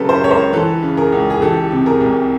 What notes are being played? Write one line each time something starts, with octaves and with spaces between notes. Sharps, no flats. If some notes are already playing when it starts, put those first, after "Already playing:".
Already playing: C#3 F#3 G4 A4 B4
A#4 C5
C#2 C#5
A#4 C5
E3 A4 B4
C#3
G#4 A#4
C#2
G#4
E3 G4 A4
C3
G#4 A#4
C2